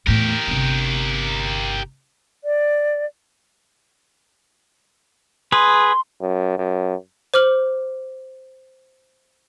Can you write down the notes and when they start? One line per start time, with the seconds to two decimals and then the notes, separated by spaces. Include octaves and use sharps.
0.07 E2 A2 G4 A#4
0.48 G1 C3
2.44 D5
5.52 G#4 B4 C6
6.21 F#2
6.58 F#2
7.34 C5 D6 F6 F#7